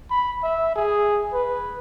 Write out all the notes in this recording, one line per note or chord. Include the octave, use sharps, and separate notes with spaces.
B5
E5
G#4
B4